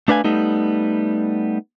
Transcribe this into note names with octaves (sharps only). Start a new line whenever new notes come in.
A3 D4 B4 F5 G#5
G3 A3 B3 D#4